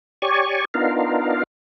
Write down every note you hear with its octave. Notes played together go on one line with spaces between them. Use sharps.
G4 C#5 D5 G#5 C#6
B3 D4 D#4 F4 A#4 F5